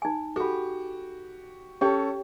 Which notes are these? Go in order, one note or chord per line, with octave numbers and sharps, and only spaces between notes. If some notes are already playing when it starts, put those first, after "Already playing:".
D#4 G#5
F#4 G4 A4 B5
C#4 G4 A4 C#5 G5